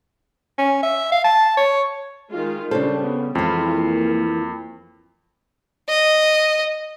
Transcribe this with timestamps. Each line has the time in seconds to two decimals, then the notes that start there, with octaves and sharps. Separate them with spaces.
0.58 C#4
0.82 E5
1.12 F5
1.24 A5
1.57 C#5
2.30 D#3 G#3 F4
2.71 C#3 G3 C#4 D4 A4 C5
3.04 B3
3.35 F2 E3 G#3 F4
3.71 A#3
5.89 D#5